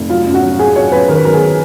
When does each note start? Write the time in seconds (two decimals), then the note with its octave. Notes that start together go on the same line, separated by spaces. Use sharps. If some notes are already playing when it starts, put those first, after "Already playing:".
Already playing: F1
0.10 F#3 F4
0.26 F#2
0.34 F#4
0.42 F#3
0.59 F#2 G#4
0.76 F#3 C#5
0.92 F#2 B4
1.08 D#3 A#4
1.17 B4
1.25 F#3 A#4
1.33 G#4